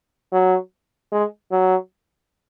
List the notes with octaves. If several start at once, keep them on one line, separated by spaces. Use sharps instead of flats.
F#3
G#3
F#3